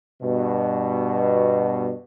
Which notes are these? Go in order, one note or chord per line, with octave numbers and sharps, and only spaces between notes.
G2 B2